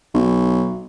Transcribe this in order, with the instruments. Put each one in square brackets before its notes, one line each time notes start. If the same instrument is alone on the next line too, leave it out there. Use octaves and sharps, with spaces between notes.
[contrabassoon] B1